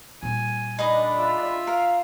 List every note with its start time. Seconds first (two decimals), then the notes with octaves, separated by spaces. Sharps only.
0.23 A#2 G3 G#5
0.79 D4 D#4 G#4 D#5 B5
1.15 F4 E5
1.67 A#4 F5